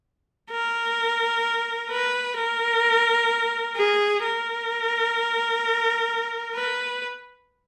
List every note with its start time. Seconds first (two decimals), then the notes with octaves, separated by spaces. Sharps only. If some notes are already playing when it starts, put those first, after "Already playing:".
0.51 A#4
1.91 B4
2.37 A#4
3.76 G#4
4.23 A#4
6.55 B4